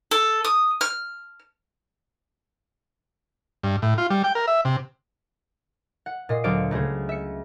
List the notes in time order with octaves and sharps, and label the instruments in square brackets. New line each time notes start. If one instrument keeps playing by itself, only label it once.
[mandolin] A4
D#6
F6
[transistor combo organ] G2
A2
F4
G3
G5
A#4
E5
C3
[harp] F#5
A#2 D#5 C7
D2 F#3 C5 D5 F5 D7
C#2 A3 G#4 C5
E5 C#7